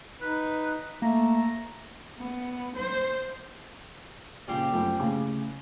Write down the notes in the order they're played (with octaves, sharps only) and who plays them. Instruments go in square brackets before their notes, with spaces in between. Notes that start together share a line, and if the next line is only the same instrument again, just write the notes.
[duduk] D#4 [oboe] B4
[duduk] A3 [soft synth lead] A#3 [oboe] A#5
[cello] B3
C5
[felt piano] A#2 C#3 [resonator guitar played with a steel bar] G3 C4 G4
[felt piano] F#2 F3 A3
A2 C#3 D6